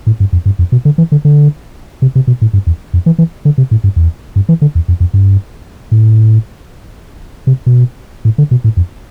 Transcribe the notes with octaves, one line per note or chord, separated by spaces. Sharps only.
A2
G2
F2
G2
F2
B2
D3
E3
D3
D3
C3
C3
B2
A2
G2
E2
F2
E3
E3
D3
C3
A2
G2
E2
G2
E3
D3
E2
F2
F2
G2
A2
C3
B2
A2
D3
B2
A2
F2